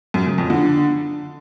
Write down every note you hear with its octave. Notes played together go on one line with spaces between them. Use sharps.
F#2
C#3
F2
D3